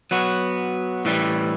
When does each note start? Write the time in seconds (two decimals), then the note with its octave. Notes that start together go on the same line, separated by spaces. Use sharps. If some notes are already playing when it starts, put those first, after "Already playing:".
0.11 F#3 B3 F#4
1.05 A2 E3 G3